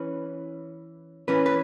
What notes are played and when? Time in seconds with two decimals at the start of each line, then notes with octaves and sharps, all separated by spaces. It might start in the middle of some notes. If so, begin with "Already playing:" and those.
Already playing: E3 C#4 B4
1.28 E3 C#4 B4
1.46 B4